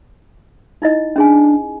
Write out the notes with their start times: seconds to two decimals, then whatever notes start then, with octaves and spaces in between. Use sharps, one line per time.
0.82 D#4 E4 D#5
1.16 C#4 D4 G#4 G#5